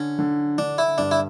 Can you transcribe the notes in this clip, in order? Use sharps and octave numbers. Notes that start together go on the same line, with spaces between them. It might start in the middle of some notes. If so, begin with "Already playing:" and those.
Already playing: D3 C#4
D3
D3 D4
E4
G2 D4
E4